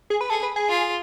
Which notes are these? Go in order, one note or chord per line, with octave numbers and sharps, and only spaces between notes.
G#4
B4
G#4 A4
B4
G#4
F4